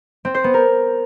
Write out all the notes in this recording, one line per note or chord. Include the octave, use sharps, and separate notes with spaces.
C4
C5
B3
A#4